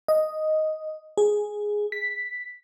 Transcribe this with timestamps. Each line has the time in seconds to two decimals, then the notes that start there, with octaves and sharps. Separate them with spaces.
0.08 D#5
1.18 G#4
1.92 B6